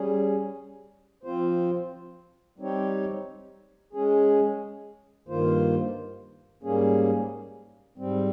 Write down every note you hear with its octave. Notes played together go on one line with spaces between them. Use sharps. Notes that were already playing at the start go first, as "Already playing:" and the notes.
Already playing: G3 C#4 G#4
F3 C4 F4 C5
G3 C4 D#4 G4 C#5
G#3 C#4 G#4
G2 D#3 A#3 F4 C5
G#2 G3 A#3 C#4 G#4
G#2 G3 C4